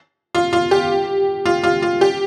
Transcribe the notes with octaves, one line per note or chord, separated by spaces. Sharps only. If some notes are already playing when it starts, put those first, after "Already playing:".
F4
F4
G4
F4
F4
F4
G4